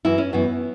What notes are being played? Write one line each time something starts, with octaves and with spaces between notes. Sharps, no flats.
F#2 E3 E4
C#4
F#2 E3 B3